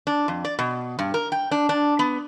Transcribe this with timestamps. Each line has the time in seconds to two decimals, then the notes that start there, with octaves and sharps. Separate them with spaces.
0.07 D4
0.28 F2
0.45 D5
0.59 B2
0.99 G2
1.14 A#4
1.32 G5
1.51 D4
1.69 D4
1.99 B3